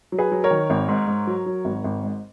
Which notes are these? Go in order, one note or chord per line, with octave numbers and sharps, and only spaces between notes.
F#3
G#4 B4
F#3
A#4 C#5
D#3
G#1
G#2
G#2
F#3
F#3
G#1
G#1
G#2